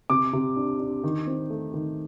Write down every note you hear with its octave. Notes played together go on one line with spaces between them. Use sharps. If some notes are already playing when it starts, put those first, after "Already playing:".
C3 D6
C3
D4
D4
D#3
C4
A3
D#3